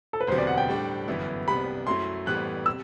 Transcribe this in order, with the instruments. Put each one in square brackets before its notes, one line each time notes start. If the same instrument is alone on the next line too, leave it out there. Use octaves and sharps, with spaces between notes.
[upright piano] A4
B4
[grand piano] E1 D2 C3 F#3 B3 [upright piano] C5
[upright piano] D5
F#5
G5
[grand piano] A2 G3 D4
G1 F#2 E3 B3 E4
[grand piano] C2 C3 G3 B3 [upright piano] B5
[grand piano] F#2 F#3 A3 E4 [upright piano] C6
[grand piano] A2 E3 G3 B3 [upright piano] F#6
[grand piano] C3 [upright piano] E6